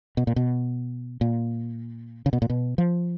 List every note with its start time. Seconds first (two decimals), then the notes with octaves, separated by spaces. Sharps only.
0.17 B2
0.27 A#2
0.36 B2
1.21 A#2
2.26 C#3
2.33 B2
2.42 A#2
2.50 B2
2.78 F3